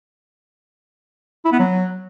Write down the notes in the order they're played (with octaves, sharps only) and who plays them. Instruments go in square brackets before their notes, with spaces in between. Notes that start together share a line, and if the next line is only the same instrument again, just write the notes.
[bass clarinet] E4
B3
F#3